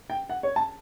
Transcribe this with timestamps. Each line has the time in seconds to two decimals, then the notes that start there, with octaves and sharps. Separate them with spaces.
0.10 G5
0.30 F#5
0.43 C#5
0.56 A5